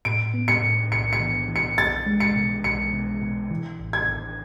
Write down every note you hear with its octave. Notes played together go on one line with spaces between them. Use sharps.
A2 D7
B3
C#7
A2
B1 C#7
C#7
E3
E3
C#7
B1 A6
G#3
C#7
B2
B1 C#7
B2
B2
E3
A1
G#6
A1